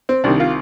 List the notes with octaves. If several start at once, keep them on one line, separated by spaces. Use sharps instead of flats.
C4
C2 C3 D#3 D4
F4